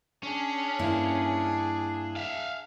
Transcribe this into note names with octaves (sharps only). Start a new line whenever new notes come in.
C#4 D4 G#4
G2 A#3 E4
E5 F5